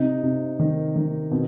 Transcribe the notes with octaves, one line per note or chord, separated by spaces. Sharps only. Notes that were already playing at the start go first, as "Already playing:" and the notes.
Already playing: C3 D#4
C3
D#3
D#3
B2 C4